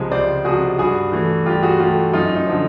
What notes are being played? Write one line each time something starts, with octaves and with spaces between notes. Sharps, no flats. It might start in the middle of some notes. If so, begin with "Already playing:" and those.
Already playing: C#2 C3 F3 G#3
C#2 C5 D5
C3 F3 G#3 F#4 G#4
G2 F#4 G#4
E3 A3
G2 F4 G4
F#4 G#4
E3 A3 F4 G4
F#2 D#4 F4
D#4
D3 F3